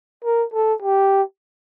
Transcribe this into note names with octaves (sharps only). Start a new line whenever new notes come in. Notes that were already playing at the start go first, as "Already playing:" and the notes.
A#4
A4
G4